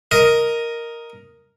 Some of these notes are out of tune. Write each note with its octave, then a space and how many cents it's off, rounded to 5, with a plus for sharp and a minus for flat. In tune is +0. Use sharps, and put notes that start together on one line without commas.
A#4 +0 D#5 +5